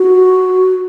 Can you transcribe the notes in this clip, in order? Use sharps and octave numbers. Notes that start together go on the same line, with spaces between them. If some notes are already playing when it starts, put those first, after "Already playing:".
Already playing: F#4